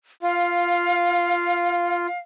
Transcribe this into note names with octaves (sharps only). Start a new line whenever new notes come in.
F4 F5